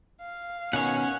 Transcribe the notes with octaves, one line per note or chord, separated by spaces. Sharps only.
F5
B2 D#3 C#4 C#5 F#5